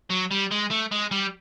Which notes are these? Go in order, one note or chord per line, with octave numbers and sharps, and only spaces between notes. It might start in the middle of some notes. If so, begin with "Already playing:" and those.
F#3
G3
G#3
A3
G#3
G3